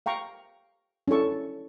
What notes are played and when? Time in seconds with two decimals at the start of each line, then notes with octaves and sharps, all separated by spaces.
0.06 F5 G5 A#5 C#6
1.08 C#4 D4 E4 A4 C#6